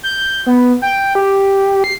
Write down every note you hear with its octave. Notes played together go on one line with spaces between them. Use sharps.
G6
B3
G5
G4
C7